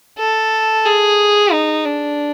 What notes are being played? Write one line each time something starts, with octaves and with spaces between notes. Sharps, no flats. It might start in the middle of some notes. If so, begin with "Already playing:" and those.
A4
G#4
D#4
D4